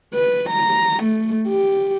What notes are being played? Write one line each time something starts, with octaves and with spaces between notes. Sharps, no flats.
B4
A#5
A3
G4